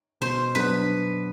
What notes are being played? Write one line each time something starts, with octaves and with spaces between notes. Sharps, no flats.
B2 C5
F#3 B3 D4 B4